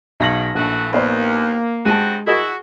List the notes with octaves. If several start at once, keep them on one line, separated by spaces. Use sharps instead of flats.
B1 G#2 C#3 A#6 F#7
A#1 E3 A3 F#4
D#2 A#3 B3 C5 D5
G2 G#3 C4 F#4 A5 D#7
E4 F#4 G#4 A#4 D#5